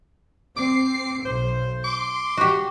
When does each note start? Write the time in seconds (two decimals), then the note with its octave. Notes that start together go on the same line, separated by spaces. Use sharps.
0.57 C4 D6 C7
1.25 B1 C5
1.84 C6 D6
2.37 F#4 G4